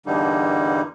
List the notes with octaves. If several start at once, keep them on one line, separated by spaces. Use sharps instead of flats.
E2 G2 D3 G3 A#3 D#4